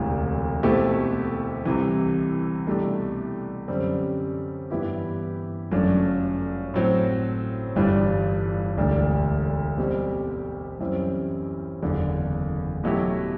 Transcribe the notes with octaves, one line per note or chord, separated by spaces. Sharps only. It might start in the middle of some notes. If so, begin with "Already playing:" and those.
Already playing: E1 D2 C3 E3
B2 A3 C4 E4 G4
C2 C3 E3
C2 B2 A3 D4 G4
F#2 D3 G3 C4
G2 E3 B3 E4 G4
G1 F#2 F#3 A3 D4
A2 F#3 C4
G1 G2 E3 G3 D4
E1 D2 D3 G3 D4
B2 G3 C4 G4
F#2 E3 G3 C4 E4
F#1 E2 D3
B2 F#3 A3 E4 G4